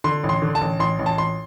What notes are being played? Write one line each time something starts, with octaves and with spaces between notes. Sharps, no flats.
D3 C6
A1
C6
D3
A5
A1
A1 C6
A1
A5
A1 C6